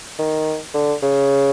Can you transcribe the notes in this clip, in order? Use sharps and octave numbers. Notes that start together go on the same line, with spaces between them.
D#3
D3
C#3